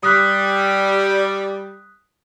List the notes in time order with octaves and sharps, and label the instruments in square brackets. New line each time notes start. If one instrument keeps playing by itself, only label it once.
[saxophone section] G3 [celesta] D#6 F#6 B6